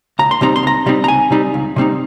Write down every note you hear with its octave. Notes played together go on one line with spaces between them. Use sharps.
C#2 A#5
C6
C3 G3 C4 D#4 A#5
C6
C#2 A#5
C3 G3 C4 D#4
A#5
C#2 G#5
C3 G3 C4 D#4
C#2
C3 G3 C4 D#4